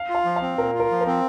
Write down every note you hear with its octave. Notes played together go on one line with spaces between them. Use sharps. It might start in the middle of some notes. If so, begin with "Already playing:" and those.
Already playing: F5
F4
F5
F3
F5
C4
A#2 A#4
F4
A#4
F3
A#4
C4